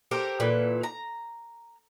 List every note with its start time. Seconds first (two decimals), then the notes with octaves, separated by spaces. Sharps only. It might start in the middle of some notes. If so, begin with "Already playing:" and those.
0.11 G4 A4 A#4 C5
0.40 A#2 E3 A4 B4
0.83 A#5